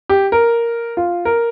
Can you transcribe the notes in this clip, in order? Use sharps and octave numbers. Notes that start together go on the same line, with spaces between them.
G4
A#4
F4
A#4